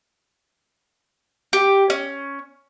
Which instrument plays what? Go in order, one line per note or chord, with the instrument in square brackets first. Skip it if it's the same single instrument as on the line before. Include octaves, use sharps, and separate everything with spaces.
[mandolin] G4
C#4